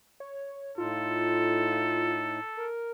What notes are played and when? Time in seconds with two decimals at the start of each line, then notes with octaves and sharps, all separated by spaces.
0.20 C#5
0.78 A2 D#4 F4 A4
2.58 A#4